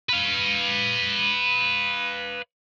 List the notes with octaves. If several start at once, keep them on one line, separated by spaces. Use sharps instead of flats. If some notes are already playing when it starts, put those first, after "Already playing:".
B4 F5